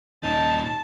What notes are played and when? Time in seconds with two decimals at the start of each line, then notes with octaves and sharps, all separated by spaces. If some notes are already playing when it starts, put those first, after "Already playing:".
0.23 D#1 A#2 C#4 D#4 A5